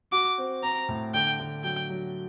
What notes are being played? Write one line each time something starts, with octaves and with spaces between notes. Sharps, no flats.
F#4 D6
C4
C4 A#5
A2
D3 G5
D3
F#3 G5
F#3